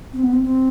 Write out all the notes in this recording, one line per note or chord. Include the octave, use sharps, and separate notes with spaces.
C4
B3
C4
C4